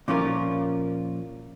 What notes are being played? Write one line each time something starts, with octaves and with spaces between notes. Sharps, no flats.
A#2 F3 C#4 F4 A#4